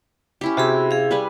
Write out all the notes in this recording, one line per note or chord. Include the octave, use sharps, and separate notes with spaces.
C#4 E4 G4
C3 F#4 G#4 B5
G#4 F5
G3 B4 G#5